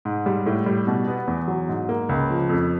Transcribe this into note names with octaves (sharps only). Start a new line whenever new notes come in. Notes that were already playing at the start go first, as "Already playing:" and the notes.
G#2
G3
A2
G3
B2
B3
E2
F#3
G#2
A#3
C#2
F3
F2